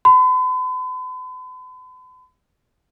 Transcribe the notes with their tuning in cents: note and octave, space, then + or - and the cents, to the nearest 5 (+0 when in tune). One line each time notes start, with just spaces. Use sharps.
B5 +45